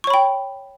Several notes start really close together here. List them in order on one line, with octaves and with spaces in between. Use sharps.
C#6 C#5 B5 G5